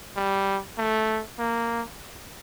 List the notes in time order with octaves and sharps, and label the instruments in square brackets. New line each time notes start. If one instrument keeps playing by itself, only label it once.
[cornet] G3
A3
A#3